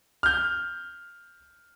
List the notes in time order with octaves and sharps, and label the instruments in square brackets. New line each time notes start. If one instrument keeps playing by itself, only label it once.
[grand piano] F6 G6